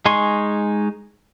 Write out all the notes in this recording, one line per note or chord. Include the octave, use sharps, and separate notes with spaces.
G#3 D#4 G#5 C6 C#6